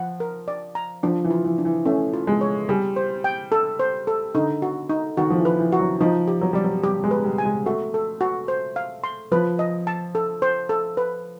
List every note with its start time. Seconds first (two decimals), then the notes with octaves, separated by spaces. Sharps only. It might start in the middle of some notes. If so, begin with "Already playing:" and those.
Already playing: F3 F#5
0.20 A#4
0.48 D5
0.75 A#5
1.03 F3 D4
1.24 E3
1.31 F4
1.45 E3
1.58 D4
1.65 E3
1.86 A3 C#4
2.14 F4
2.27 G#3
2.41 C#5
2.69 G3 G#4
2.96 C5
3.24 G5
3.52 A4
3.80 C5
4.07 A4
4.35 D3 D#4
4.62 F#4
4.90 D#4
5.17 D#3 F#4
5.30 F3
5.38 E3
5.45 B4
5.59 E3
5.72 F#4
5.79 F#3
6.00 F3 D#4
6.28 G4
6.42 F#3
6.53 G3 D5
6.64 F#3
6.84 G3 G4
7.04 G#3
7.11 B4
7.25 G3
7.38 G#5
7.45 G#3
7.66 A3 F#4
7.94 A4
8.21 F#4
8.48 C5
8.76 F5
9.04 C6
9.31 F3 B4
9.59 D#5
9.87 A5
10.15 A4
10.42 C5
10.69 A4
10.97 B4